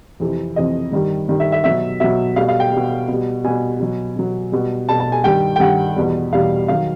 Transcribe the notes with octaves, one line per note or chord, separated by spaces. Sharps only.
F2 C3 E3
F2 C3 E3 D#5
G2 D#3 G3
G2 D#3 G3
E5
E5
B2 F#3 E5
B2 F#3 E5
B2 G3 F5
F5
G5
B2 G3
B2 G3
B2 G3 G#5
B2 F#3
B2 F#3
B2 G3
B2 G3 A5
A5
G#5
G2 D#3 G3 G5
G5
G2 D#3 G3 F#5
E2 B2 G3
E2 B2 G3 F5
D#3 F#3 F5